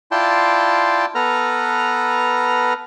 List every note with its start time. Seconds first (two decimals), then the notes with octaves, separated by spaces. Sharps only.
0.11 E4 F4 D5 G5 A5 C6
1.15 B3 A4 B4 A#5 F6